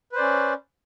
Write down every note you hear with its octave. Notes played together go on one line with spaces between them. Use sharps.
C#4 B4 C5 D5